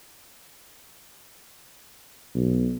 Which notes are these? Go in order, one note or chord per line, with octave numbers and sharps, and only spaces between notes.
B1